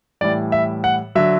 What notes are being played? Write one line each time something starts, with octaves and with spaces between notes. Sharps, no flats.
A2 E3 G3 D5
E5
F#5
D3 F#3 E5